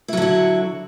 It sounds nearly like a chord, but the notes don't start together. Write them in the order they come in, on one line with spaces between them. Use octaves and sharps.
E4 F#3 D3 F#4